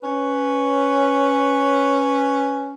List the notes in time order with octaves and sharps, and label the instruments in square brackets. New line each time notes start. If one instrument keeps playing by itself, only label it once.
[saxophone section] C#4 B4